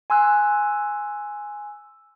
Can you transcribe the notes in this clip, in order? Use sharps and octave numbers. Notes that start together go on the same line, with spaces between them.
G#5 C6 E6 F#6